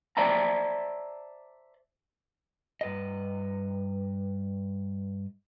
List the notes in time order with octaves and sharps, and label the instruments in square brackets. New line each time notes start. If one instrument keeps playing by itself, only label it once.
[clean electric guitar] C5 D5 E5 A5 A#5
[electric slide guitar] G2 B4 D#5